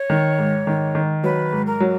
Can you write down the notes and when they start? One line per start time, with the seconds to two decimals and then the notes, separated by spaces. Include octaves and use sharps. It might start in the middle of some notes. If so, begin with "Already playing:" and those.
Already playing: C#5
0.10 D#3
0.38 G#2
0.67 D#3
0.95 D#3
1.24 F#3 B4
1.52 G#2
1.67 A#4
1.80 F#3